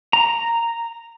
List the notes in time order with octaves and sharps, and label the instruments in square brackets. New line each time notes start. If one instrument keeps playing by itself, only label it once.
[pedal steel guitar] A#5